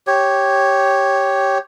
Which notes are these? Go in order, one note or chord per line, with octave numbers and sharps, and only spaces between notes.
G4 C#5